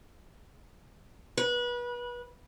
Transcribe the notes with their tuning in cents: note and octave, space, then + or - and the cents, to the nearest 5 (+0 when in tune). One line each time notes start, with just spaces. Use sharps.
B4 -30